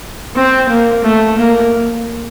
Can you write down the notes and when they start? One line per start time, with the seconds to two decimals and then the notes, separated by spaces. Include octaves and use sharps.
0.36 C4
0.69 A#3
1.04 A3
1.37 A#3